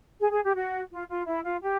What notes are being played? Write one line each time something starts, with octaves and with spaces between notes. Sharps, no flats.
G#4
G#4
G4
F#4
F4
F4
E4
F4
G4